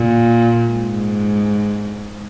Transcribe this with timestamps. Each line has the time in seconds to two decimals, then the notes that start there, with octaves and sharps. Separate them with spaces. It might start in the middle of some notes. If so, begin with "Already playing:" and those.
Already playing: A#2
0.70 G#2